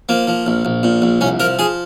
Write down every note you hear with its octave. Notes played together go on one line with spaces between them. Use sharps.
F3 A#3
F3
A#1
A#1
A#2
A#1
C2 C#4
F3 A#4
F3 G#4